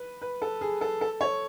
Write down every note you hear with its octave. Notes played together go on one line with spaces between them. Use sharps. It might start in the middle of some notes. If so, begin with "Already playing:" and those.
Already playing: B4
B4
A4
G#4
A4
A4
C#5